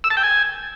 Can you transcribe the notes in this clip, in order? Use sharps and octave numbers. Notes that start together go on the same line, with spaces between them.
E6
A5
G5
G#5